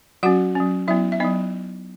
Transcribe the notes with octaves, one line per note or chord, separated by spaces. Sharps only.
F#3 C#4 F#4 F#5
F#3 C#4
F#3 B3 E4 E5
E5
F#3 B3 D#4 D#5